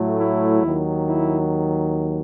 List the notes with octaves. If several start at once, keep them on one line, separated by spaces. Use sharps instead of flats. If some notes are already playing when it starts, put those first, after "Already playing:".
Already playing: A2 F#3 A3
E4
D#2 D#3 F#3
E4